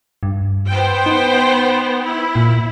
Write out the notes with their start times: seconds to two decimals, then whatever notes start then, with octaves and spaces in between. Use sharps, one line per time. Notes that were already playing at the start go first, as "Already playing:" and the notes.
0.23 G2
0.69 B3 C5 G5
1.06 D#4
2.05 E4
2.36 A#2